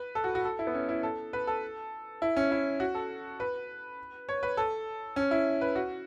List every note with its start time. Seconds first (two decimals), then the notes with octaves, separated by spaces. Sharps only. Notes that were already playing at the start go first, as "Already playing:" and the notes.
Already playing: B4
0.15 A4
0.24 F#4
0.35 F#4
0.45 A4
0.59 E4
0.67 B3
0.74 C#4
0.89 E4
1.03 A4
1.33 B4
1.47 A4
2.22 E4
2.37 C#4
2.51 E4
2.80 F#4
2.95 A4
3.40 B4
4.29 C#5
4.43 B4
4.57 A4
5.16 C#4
5.31 E4
5.61 B4
5.76 F#4